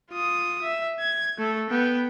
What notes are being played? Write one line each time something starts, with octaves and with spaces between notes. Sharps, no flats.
F4 D#6
E5
G#6
A3 A4
B3 G5